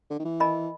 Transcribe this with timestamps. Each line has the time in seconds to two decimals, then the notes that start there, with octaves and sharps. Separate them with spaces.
0.10 D3
0.20 D#3
0.25 E3
0.40 A#4 D#5 G#5 B5